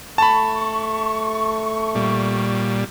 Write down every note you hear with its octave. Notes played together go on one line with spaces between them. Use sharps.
A3 A5 B5 C#6
A#2 G3